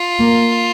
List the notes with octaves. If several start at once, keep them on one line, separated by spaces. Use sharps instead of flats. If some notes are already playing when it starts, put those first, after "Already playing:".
Already playing: F4
A#3